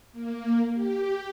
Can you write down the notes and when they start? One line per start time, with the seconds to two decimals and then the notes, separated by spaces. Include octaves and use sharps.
0.12 A#3
0.74 G4